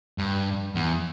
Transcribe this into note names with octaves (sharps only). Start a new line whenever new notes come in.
G2
E2